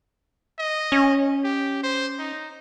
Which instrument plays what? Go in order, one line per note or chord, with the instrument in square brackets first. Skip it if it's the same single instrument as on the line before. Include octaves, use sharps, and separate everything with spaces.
[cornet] D#5
[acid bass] C#4
[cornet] G4
C5
D#4